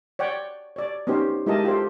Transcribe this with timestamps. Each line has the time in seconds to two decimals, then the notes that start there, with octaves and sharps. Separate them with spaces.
0.19 C#5 D5 F#5 G5
0.76 C#5 D5
1.07 B3 C#4 D#4 G4 C5
1.46 G#3 E4 G4 A#4 D#5 A5
1.64 F4 G4 A4 C5